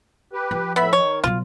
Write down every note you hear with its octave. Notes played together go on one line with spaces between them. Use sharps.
G4 B4
F3
A2 B3 E5 B5
D#3 C#5
B2 F#3 F4